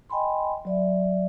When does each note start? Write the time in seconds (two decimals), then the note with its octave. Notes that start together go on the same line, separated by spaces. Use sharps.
0.10 D#5 G5 G#5 B5 C6
0.65 F#3 D5 E5